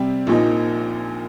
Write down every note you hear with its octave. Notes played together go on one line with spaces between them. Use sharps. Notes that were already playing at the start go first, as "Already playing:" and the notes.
Already playing: C3 G3 C4 G4
A#1 A#2 F3 D#4